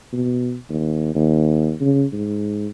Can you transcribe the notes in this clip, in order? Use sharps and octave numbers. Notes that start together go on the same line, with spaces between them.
B2
D#2
D#2
C#3
G#2